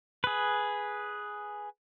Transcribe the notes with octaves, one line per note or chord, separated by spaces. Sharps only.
G#4 B4